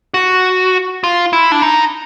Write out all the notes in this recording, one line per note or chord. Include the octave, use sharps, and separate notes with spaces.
F#4
F4
E4
D4
D#4